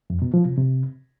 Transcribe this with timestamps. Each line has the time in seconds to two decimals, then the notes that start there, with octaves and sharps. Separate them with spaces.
0.10 F2
0.22 B2
0.34 F3
0.45 C3
0.57 C3